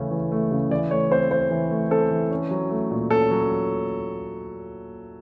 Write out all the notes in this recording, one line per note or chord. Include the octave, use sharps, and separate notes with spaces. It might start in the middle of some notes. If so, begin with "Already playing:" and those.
Already playing: C#3 E3 A3 C#4
E3
A3
C#3
E3 D5
A3 C#5
C4 C5
E3 C5
E3
A3
C4 A4
E3
C#4
F#3
A3
A#2
C#4 A4
F#3